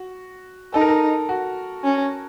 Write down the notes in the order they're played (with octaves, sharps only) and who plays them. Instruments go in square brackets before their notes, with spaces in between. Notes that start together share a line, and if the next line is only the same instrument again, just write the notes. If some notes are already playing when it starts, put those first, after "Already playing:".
Already playing: [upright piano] F#4
[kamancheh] D#4 [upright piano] A4
[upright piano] A#4
A4
F#4
[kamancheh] C#4